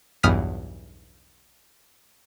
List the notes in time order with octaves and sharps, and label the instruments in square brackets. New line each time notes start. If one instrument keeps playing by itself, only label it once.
[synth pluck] B1 E2 G2 D#6 F6 B6